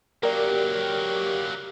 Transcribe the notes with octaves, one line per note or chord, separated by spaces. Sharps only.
F#3 A#3 G4 A#4 D5